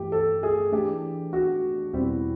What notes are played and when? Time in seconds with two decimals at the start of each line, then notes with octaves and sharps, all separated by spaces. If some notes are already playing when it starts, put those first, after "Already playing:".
Already playing: G2 E3 A3 G4
0.12 A4
0.43 G#4
0.72 E3 A3 D4 G4
1.33 F#4
1.93 E2 B2 G3 C4 E4